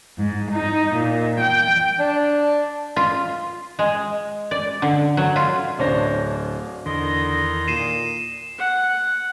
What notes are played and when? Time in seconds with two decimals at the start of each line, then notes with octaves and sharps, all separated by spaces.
0.18 G#2
0.52 D#4
0.96 A#2
1.41 G5
2.00 D4
2.96 F4
3.79 G#3
4.51 D5
4.82 D3
5.17 F#3
5.36 F4
5.79 D1 C#4 D4 C5 A#6
6.86 E2 D3 D#3 A#4 D#5 C6
7.68 A#2 C7 D#7 E7
8.58 F#5